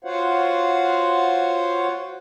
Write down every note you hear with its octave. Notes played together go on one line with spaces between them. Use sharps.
F4 F#4 C5 C#5 F5 F#5